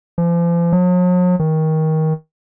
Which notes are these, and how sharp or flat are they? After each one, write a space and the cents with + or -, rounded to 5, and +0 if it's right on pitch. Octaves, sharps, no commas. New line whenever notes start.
F3 -40
F#3 -45
D#3 +20